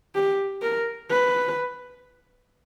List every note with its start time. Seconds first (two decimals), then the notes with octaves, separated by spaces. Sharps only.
0.15 G4
0.62 A#4
1.10 B4